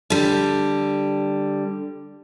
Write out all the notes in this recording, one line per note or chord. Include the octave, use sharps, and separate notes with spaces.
D3 G3